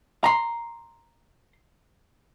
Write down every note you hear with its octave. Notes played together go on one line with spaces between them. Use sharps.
A#5 C6